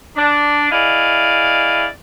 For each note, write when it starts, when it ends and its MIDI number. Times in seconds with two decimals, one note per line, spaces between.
0.16 0.70 62
0.71 1.86 64
0.71 1.86 68
0.71 1.86 74
0.71 1.86 75
0.71 1.86 77